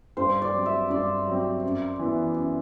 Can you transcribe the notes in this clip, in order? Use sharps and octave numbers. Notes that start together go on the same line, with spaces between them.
G2 C5
D5
F#3 C4
E5
G2 D5
F#3 C4
F#2
E3 B3
F#2